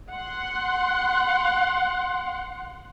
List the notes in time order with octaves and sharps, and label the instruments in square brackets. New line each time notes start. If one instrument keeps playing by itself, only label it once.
[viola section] F#5 C6